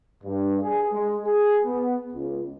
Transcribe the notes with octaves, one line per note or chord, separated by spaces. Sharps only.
G2
G#4
G#3
G#4
B3
C#2